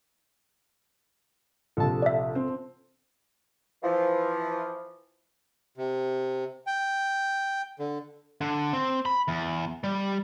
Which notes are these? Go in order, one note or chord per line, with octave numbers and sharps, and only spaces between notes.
A#1 C3 A4 A5
D5 E5
C4
E3 F3
C3
G5
D3
D3
C4
B5
E2
G3